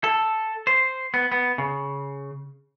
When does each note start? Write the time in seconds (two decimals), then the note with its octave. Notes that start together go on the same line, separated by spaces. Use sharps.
0.04 A4
0.67 C5
1.14 B3
1.32 B3
1.58 C#3